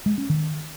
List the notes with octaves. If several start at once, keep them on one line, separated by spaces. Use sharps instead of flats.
G#3
C#4
D#3